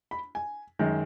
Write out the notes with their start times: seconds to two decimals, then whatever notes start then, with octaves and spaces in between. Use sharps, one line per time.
0.11 B5
0.35 G#5
0.79 F#2 D#3 G#3